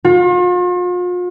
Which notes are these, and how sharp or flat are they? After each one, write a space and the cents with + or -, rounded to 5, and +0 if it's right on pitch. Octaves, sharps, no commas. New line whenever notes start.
F4 +40